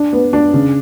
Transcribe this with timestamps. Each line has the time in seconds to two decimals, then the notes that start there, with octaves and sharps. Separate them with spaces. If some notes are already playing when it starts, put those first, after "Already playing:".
Already playing: D4
0.13 B3
0.33 D4
0.54 C#3